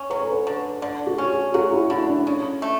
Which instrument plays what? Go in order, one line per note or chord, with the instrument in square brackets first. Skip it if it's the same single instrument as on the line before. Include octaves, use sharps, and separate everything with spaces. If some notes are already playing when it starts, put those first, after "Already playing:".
Already playing: [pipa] C#4
[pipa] F#3 [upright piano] B4
[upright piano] A4
B4
[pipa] D3
[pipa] D3 [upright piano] D5
[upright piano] F#4
[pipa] C#4
[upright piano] G#4
[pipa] F#3 [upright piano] F#4
[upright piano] E4
[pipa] D3 [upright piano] E4
[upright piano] D4
[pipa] C#3 [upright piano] C#4
[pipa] A3